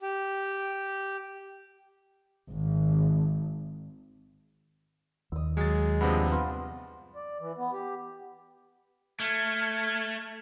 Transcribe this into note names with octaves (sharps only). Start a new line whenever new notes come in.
G4
G#1
D#2 D#5 E6
F#3 G#3 A6
G2 C3 F3 B3 D4
B3 F4
D5
E3
B3
G4
A3 F6 G#6